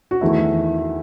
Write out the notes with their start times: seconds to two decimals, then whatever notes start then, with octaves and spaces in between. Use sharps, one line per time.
0.11 F#4
0.21 E2 D#3 A3 E4